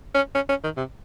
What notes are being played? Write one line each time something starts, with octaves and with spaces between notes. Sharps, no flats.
C#4
C#4
C#4
D#3
C3